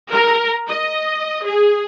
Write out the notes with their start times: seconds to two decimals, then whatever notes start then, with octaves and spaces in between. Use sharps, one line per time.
0.11 A#4
0.69 D#5
1.45 G#4